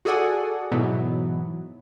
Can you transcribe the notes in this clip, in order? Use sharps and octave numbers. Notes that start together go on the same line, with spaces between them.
F#4 G#4 A4 D5 F#5 G#5
G#2 B2 E3 F#3 B3